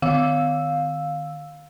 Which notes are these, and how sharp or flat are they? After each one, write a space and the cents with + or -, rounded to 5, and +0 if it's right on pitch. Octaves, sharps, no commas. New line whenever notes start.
D#3 -35 F5 +10 E6 +0